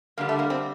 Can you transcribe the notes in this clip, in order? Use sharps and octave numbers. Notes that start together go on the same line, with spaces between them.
G2 D3 G3 A#3
A3
A#3
C4